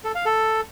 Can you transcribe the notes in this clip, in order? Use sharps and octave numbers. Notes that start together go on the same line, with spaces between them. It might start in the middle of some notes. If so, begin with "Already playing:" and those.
A4
F5
A4